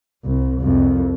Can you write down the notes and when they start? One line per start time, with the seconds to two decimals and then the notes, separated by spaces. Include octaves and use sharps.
0.24 C2
0.60 C2 F2